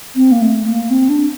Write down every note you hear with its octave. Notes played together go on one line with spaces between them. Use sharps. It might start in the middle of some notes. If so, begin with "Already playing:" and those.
C4
A#3
A3
A#3
C4
D4